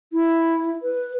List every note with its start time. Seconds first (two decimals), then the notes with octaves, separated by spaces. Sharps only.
0.13 E4
0.82 B4